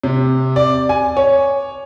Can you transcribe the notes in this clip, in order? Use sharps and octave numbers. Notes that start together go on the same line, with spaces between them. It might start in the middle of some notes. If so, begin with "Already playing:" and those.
C3
D5
G#5
C#5